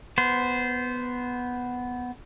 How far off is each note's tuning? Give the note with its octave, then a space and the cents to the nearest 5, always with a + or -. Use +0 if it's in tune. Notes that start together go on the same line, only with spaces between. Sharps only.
B3 +0 C5 -15